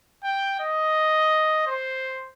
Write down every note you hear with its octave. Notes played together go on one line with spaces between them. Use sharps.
G5
D#5
C5